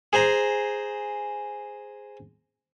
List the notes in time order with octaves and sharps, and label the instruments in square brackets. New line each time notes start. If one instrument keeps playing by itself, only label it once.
[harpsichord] G#4 C5 G#5 A#5